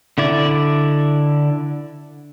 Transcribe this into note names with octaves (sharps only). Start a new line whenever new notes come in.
D3 E4 D5